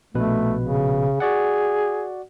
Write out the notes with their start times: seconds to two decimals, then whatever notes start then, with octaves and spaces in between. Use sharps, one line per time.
0.15 A#1 B2 A3 B4
0.61 C#3
1.20 F#4 G#4 D5 F#5